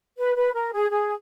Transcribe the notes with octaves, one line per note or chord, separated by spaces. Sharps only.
B4
B4
A#4
G#4
G#4